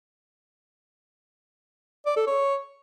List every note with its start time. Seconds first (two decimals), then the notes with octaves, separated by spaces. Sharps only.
2.06 D5
2.17 A4
2.27 C#5